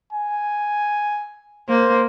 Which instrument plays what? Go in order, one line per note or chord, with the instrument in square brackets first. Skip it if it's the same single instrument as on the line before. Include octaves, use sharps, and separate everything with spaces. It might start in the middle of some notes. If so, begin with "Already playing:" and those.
[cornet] G#5
[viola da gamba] A#3 [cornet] C5